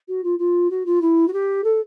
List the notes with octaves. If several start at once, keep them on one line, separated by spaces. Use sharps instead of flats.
F#4
F4
F4
F#4
F4
E4
F#4
G4
A4